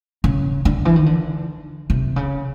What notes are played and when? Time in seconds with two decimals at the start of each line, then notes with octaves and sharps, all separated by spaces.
0.24 C#3
0.65 D3
0.85 E3
0.96 D#3
1.06 D3
1.90 C3
2.16 C#3